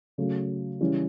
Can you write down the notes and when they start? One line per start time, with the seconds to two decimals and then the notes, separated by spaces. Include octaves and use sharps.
0.18 C#3 F#3 A3
0.81 C#3 E3 G3 C#4